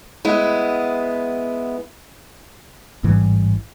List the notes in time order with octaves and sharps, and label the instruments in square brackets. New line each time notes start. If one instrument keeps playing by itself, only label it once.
[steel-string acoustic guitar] G#3 B3 E4
[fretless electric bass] A1 G#2 E3 G3